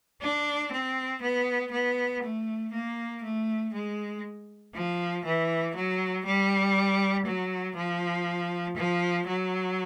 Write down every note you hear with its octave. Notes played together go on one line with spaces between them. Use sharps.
D4
C4
B3
B3
A3
A#3
A3
G#3
F3
E3
F#3
G3
F#3
F3
F3
F#3